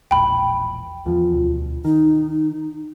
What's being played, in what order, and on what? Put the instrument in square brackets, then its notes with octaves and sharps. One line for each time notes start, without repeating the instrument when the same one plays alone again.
[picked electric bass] E1 A#1 [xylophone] G5 B5
[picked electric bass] E2 F3 [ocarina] F4
[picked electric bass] D2 B2
[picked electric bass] D#3 [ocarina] D#4